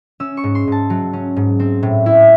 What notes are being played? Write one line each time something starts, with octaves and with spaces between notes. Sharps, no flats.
C#4 E6
C#6
G#2
C6
G#2 A5
F#3
C#4
G#2
C4
A2
E4